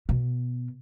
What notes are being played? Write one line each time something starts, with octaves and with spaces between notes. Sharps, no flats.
B2